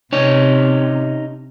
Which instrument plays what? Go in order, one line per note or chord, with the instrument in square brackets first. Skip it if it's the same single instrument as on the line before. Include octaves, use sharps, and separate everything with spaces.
[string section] C3 [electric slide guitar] C#4 D#4 C#5